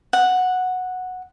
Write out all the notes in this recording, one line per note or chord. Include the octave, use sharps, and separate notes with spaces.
F#5